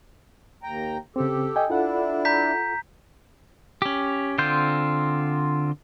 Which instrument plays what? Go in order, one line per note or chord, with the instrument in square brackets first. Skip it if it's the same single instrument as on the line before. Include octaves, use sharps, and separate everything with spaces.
[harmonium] D#2 G5 A#5
[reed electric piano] C#3 C4 [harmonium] G4 A4
[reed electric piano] D#5 G5 G#5
[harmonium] D4 E4 [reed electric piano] F4 A4 F#5
[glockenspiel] A#5 G6 B6
[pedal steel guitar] C#4 G4
D3 C4 F4 G6